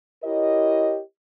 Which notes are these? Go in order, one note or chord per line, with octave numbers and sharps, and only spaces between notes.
E4 G4 A#4 C#5 D#5